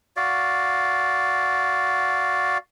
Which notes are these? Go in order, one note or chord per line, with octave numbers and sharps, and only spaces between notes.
F#4 D5 F5